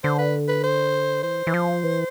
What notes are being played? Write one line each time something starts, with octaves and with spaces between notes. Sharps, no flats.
D3 C5
B4
B4
C5
E3 C5
E3
F3
E3